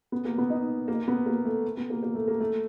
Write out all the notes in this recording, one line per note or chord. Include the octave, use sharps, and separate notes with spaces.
B3
A#3
B3
D#4
A#3
B3
A#3
A3
B3
A#3
A#3
A3
A#3
A3